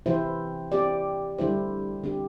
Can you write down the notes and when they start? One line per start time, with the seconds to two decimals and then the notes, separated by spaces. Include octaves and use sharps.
0.06 C3 E3 C4 E4 C5
0.72 C4 G4 D5
1.38 D3 G3 E4 C5
2.04 D3 C4 G4